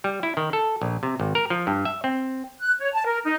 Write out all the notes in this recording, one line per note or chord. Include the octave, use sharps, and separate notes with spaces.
G3
E4
D#3
A4
A#1
C3
G#1
A#4
F3
G2
E5
C4
F#6
C#5
A5
A#4
D#4